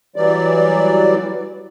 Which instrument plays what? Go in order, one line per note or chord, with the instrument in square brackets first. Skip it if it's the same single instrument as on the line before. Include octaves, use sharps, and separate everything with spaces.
[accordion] E3 F#3 G3 D5